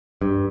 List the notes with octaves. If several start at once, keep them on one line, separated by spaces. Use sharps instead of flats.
G2